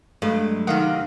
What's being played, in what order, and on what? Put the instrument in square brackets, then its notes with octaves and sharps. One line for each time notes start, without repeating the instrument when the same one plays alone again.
[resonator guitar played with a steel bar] G2 [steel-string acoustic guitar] F#3 G#3 A3
[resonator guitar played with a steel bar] C3 D#3 [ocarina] D#4 [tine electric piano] F5 F#5